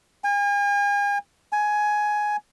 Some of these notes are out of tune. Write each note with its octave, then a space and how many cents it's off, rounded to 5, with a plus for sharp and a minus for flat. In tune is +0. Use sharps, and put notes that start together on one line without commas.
G#5 -40
G#5 +10